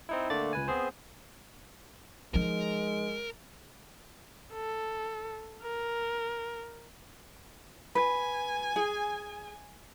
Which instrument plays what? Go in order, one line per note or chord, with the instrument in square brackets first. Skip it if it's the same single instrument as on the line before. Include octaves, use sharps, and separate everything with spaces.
[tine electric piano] C4 D#4 E4
D3 A3 A#3 D5 A6
C#2 B4 G#5
B3 C4 G#4 C5
[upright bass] F3 D#4 [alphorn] G#3 [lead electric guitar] A#4
[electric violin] A4
A#4
[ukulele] B4 [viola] G#5
[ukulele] G#4